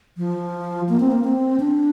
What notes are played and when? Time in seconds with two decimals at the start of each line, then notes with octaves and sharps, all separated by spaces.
0.18 F3
0.89 A#3
1.00 C4
1.12 A#3
1.24 C4
1.60 D4